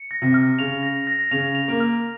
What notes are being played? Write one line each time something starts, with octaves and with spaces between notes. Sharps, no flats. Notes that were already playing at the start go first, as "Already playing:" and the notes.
Already playing: C#7
A#6
C3
F6
C#3 F7
A#6
A#6
C#3 F7
F7
A#3
F6